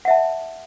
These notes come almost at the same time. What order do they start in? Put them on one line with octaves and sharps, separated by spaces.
F#5 E5 A5